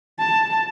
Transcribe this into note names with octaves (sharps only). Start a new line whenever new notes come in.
A5